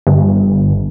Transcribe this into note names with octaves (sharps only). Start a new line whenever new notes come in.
G1